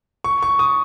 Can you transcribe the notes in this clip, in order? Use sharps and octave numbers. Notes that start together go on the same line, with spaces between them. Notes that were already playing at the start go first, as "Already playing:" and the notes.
C#6
C#6
D#6